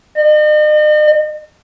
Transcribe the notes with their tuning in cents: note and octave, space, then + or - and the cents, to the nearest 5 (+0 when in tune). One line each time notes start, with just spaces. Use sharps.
D#5 -45